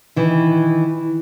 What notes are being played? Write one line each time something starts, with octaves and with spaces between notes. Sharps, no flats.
D#3 E3